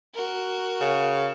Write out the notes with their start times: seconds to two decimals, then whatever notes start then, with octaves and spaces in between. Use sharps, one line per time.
0.14 F#4 A#4
0.81 C#3